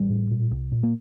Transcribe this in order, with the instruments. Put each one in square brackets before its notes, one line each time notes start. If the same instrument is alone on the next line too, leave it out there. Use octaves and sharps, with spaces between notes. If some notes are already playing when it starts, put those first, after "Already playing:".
Already playing: [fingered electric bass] A1 G3
A2
A#2
C2
A#2
A#3